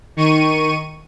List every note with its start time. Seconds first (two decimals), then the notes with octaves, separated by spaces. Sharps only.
0.16 D#3 C#6 D#7